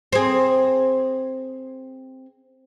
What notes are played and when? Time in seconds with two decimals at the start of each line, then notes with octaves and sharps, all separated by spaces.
0.13 C4 G#4